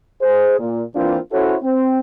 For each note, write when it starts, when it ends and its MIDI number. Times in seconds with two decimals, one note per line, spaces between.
0.21 0.56 68
0.21 0.56 72
0.59 0.82 46
0.95 1.18 52
0.95 1.18 58
0.95 1.18 60
0.95 1.18 62
0.95 1.18 65
1.32 1.56 61
1.32 1.56 64
1.32 1.56 66
1.32 1.56 69
1.32 1.56 72
1.32 1.56 73
1.64 1.99 60